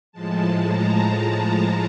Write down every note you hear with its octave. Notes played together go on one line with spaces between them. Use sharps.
A2 F3 G#3 A5
A#5